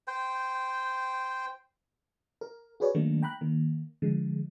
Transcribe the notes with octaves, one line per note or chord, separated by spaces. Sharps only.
C5 G5
A#4
F#4 G#4 B4 C#5 D5
D#3 F#3 A3 A#3 D4 D#4
G5 A#5 B5 F#6
D#3 A#3
D3 F3 G#3